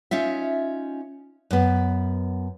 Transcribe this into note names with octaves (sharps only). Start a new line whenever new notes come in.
C#4 D#4 F4 E5
F#2 B3